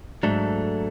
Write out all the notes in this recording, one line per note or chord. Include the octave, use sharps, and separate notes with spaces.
G#2 F#3 A3 D4 A4